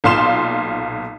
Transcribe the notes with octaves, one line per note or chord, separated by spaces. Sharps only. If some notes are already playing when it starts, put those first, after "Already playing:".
B1 A#2 F5 C6 E7